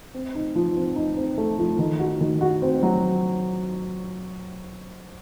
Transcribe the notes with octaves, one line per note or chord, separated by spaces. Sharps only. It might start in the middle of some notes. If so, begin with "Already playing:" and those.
C4
D#4
F3
C4
D#4
C4
A3
F3
D#3
F#4
D#3
F#4
C4
F#3